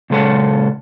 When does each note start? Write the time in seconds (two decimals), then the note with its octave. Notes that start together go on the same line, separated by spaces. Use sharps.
0.10 A#2 C#3 G#3 A4 C#5 F#5